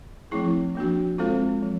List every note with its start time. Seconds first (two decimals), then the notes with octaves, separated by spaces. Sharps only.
0.31 F3 A3 C4 E4 G#4
0.75 F3 A#3 D4 F#4
1.18 G#3 C4 F4 A4 C5
1.62 F3